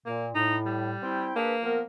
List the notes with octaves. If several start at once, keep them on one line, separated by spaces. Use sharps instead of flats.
A#2 A#3
A2 D#4
G3
C4 E4 G5
A#3 D4 G#4 B4
F3 B3 A#4